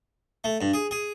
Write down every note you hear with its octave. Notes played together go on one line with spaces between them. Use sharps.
A3
G2
G#4
G#4